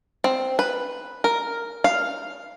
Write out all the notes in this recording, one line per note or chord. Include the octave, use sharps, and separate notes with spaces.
C4
B4
A#4
F5